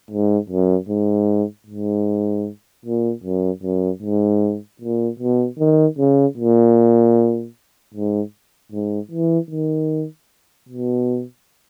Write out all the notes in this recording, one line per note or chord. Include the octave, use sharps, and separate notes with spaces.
G#2
F#2
G#2
G#2
A#2
F#2
F#2
G#2
A#2
B2
D#3
C#3
A#2
G#2
G#2
E3
D#3
B2